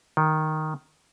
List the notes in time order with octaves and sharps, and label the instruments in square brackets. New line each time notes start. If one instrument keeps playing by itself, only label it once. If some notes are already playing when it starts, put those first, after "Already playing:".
[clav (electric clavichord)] D#3